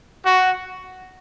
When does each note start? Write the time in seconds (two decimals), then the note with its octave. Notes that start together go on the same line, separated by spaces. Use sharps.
0.24 F#4